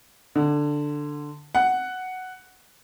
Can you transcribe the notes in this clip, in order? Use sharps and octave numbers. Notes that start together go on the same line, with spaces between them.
D3
F#5